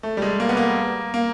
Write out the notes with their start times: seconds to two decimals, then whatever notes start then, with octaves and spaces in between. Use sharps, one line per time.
0.03 A3
0.17 G3
0.22 G#3
0.40 A#3
0.49 B3
0.57 A#3
1.14 A#3